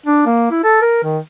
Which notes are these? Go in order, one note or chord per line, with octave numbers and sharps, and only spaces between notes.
D4
A#3
E4
A4
A#4
D#3